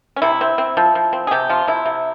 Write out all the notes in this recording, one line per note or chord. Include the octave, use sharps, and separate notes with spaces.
C#4
C3 E4
C4
C4
F3
F3
C4
G#4
C3 G4
F3 F4
C3 E4
C3